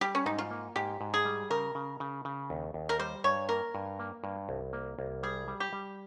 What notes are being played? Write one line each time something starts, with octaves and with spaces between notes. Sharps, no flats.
G3 G4
C#4
G#2 D#4
F4
A#3
G#2 G4
G#2
G#4
G3
C#3 A#4
C#3
C#3
C#3
D#2
D#2
A#4
G3 C5
G2 C#5
A#3 A#4
G2
A#3
G2
C2
A#3
C2
G3 G#4
G3
G4
G3